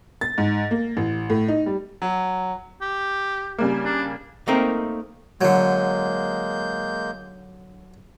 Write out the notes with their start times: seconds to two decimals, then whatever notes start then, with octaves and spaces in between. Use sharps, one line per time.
0.21 A6
0.38 G#2
0.71 A#3
0.97 A1
1.30 A2
1.48 D#4
1.66 G3
2.02 F#3
2.81 G4
3.58 C#3 G3 A#3
3.85 D4
4.48 A3 A#3 C4 D#4 A#4
5.41 D3 F#3 G#3 A#3 G6